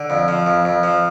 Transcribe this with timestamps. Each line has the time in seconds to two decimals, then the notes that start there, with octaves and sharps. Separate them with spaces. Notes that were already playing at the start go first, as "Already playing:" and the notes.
Already playing: D3
0.10 F2
0.28 F3
0.46 F2
0.65 F2
0.83 F3